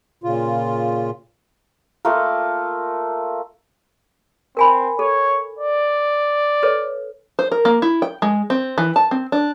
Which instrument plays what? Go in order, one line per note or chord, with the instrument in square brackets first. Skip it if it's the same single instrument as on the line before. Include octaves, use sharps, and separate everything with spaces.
[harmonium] A#2 C#3 F4
[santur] A3 A#3 F4 A#4
[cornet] C4 [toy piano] A#4 G#5 B5
[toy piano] A4 [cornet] C#5
[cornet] D5
[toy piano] A4 B4 C#5
[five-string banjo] C5
A#4
A#3
E4
G5
G#3
C4
E3
A5
C4
D4